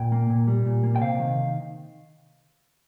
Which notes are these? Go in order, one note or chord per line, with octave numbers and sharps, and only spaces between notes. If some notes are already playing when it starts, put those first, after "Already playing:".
Already playing: A#2 G5
A#3
A#2
G3
A#2
A#3
G5
C3 F5
D#3